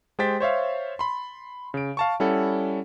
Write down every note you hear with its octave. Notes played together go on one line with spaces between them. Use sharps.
G#3 G4 C5 G5 A6 B6
C5 C#5 E5 F5
B5 C6
C#3 D7
F5 A5 C#6
G3 C#4 E4 A4 F#5